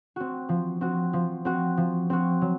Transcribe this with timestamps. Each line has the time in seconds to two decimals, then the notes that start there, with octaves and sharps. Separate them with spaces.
0.16 C4 F#4
0.49 F3
0.81 C4 F#4
1.13 F3
1.45 C4 F#4
1.77 F3
2.10 C4 F#4
2.41 F#3